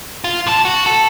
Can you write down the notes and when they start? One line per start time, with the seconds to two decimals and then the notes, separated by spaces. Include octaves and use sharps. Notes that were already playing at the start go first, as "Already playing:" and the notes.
0.24 F4
0.47 C3 A5
0.65 F#4
0.86 A4